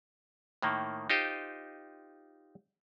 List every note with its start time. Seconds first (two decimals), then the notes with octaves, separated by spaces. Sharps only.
0.62 A2 D#3 A#3
1.10 D#4 F4 G4 C5 D#5